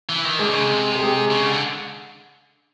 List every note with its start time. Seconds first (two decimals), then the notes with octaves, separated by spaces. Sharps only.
0.09 E3
0.25 D#3
0.39 D3 G#3 G#4
0.49 C#3
0.60 C3
0.95 G4
1.00 G#3 G#4
1.31 C#3
1.46 D3